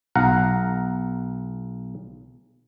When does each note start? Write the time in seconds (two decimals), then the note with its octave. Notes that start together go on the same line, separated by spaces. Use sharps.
0.15 B1 F5 F#5 A#5